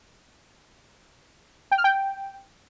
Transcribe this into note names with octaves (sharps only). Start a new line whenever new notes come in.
G5
F6
G5